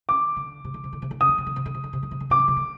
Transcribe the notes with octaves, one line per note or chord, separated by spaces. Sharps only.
D#3 D6
D3
C3
D3
C3
D3
C3
D3
C3 D#6
D3
C3
D3
C3
D3
C3
D3
C3
D3
C3
D3
C3 D6
D3
C3
D3